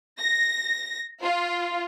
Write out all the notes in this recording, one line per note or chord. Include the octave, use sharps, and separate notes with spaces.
A#6
F4